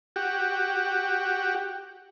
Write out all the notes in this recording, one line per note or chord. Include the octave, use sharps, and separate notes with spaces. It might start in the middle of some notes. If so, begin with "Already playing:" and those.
F#4 G4